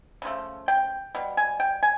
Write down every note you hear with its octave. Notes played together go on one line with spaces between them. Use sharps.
C#3 F3 A3
G5
B2 G3
G#5
G5
G#5